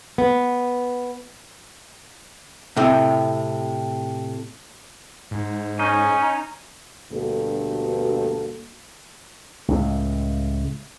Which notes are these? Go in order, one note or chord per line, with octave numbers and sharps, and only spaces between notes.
B3
A2 C3
G#2
C#4 D#4
D2 G2 B2 A#3 F#4 A4
C#2 A2